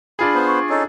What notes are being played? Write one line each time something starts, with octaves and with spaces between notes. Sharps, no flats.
D4 F4 G#4 B5
B3 C5
C#6
C#4 D#4 A4